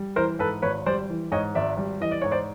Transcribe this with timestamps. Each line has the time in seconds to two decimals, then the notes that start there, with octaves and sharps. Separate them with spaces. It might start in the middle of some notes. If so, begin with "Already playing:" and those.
Already playing: G3
0.16 E3 A#4 C5
0.39 G#2 A4 B4
0.62 G#1 B4 C#5
0.86 G3 C5 D5
1.09 E3
1.32 G#2 C#5 D#5
1.55 G#1 D5 E5
1.77 G3
2.01 E3 D#5
2.11 D5
2.22 G#2 C#5
2.31 C5 D5